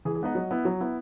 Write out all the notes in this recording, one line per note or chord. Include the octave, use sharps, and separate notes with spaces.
E3 G#4
G#4
G#3 B3 D#4 D#5 F#5
F#3
B3 E4
F#3
B3 E4